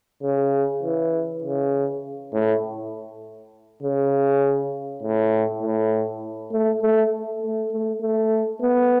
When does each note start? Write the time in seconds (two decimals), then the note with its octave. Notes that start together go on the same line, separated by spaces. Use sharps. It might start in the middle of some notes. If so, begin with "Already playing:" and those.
0.23 C#3
0.83 E3
1.44 C#3
2.33 A2
3.83 C#3
5.03 A2
5.62 A2
6.52 A3
6.82 A3
7.42 A3
7.72 A3
8.01 A3
8.61 B3